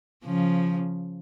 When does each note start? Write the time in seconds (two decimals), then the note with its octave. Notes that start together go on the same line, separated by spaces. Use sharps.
0.25 C#3 F3